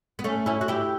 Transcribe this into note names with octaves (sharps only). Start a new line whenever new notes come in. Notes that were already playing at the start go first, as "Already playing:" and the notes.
B3
A3 C#4
C#4 E4
F#4
E4 G4